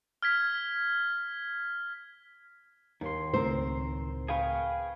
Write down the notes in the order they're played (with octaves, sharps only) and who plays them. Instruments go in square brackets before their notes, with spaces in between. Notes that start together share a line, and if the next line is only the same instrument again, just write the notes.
[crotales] F6 G#6 B6
[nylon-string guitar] D#2 [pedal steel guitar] D#3 C6
[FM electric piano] C#2 A2 [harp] C4 A#4 [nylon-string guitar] C5
[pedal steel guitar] G#4 G5 C#6 [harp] B4 F5 G#5